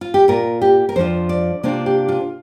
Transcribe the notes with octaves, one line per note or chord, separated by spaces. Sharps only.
F4
G4
A#2 A#3 F4 A#4
G4
A#4
F2 F3 D4 F4 C5
D5
C3 A#3 D4 F4 C5
G4
F4